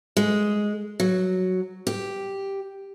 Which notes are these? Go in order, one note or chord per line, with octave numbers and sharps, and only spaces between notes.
G#3
F#3
G4